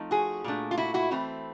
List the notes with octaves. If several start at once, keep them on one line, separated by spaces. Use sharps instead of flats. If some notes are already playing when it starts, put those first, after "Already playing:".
Already playing: F3 A3 C4 D#4
F#4 G#4
A#2 F#3 A3 D4
F4
E4 F#4
E4 F#4
E3 A3 C4